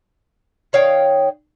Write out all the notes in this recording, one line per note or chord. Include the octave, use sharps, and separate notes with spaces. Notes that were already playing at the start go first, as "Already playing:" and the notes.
D#3 C#5 F5 G5